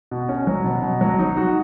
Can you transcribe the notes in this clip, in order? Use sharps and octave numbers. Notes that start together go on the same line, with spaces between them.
B2
C#4
F#3
B2
B2
F#3
D#4
F#4